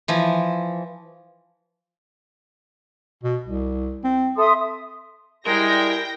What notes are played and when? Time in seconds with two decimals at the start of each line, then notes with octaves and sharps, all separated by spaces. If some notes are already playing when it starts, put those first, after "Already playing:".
0.08 E3 F3
3.23 B2
3.44 C2
4.04 C4
4.37 A4 E5 C6 D#6
5.47 G3 G#3 E4 A#4 G5 A#6